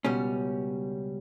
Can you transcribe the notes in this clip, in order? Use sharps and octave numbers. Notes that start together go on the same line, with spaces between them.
C#2 B2 G3 C#4